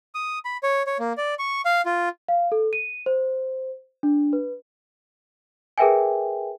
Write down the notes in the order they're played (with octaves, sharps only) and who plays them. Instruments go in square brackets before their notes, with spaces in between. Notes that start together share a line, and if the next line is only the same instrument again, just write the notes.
[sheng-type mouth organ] D#6
B5
C#5
C#5
A#3
D5
C#6
F5
F4
[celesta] F5
A4
D#7
C5
D4
B4
G#4 A#4 B4 E5 G5 G#5